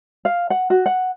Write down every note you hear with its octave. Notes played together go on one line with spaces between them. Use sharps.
F5
F#5
F#4
F#5